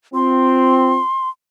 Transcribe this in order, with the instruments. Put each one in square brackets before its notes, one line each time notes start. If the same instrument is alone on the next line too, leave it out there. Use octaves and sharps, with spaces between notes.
[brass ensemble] C4 F4 [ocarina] C6